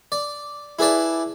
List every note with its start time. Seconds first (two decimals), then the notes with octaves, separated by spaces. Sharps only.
0.12 D5
0.79 E4 G#4 B4 D5 A5